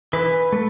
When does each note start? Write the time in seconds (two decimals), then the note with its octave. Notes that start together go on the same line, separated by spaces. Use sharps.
0.13 E3 B4
0.53 A3